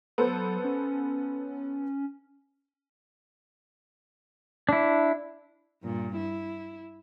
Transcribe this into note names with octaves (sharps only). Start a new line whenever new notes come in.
F#3 B3 A4 C5
C#4
D4 E4
G2 A#2
E4